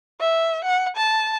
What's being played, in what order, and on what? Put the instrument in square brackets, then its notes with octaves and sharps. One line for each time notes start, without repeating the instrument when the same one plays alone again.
[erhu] E5
F#5
A5